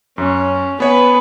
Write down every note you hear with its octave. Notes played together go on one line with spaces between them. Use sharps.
F#2 C#4
B3 B4 C#5 G#5